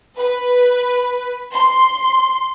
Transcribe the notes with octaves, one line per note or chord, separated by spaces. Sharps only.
B4
C6